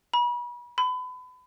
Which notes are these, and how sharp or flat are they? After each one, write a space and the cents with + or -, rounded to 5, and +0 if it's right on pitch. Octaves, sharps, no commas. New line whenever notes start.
B5 -35
B5 +30